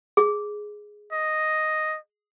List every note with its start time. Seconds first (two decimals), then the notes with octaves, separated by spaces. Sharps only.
0.17 G#4
1.12 D#5